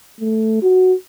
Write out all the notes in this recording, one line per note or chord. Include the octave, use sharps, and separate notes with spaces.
A3
F#4